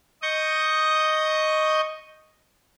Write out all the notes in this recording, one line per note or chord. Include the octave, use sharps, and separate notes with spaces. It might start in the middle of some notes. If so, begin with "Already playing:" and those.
D#5 C#6 D#6 G6